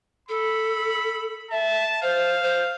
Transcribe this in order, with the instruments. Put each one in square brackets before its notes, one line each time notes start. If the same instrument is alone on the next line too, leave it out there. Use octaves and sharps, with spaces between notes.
[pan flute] A4 [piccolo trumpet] B5
[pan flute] E5 [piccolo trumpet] A5
[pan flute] C5 [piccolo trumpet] F5
[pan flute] C5